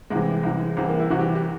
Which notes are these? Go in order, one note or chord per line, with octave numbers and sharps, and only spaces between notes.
C2 C3 E3 G#3
C2 C3 E3
C2 C3 E3
A#3
E4
C2 C3 E3 F#4
G4
G4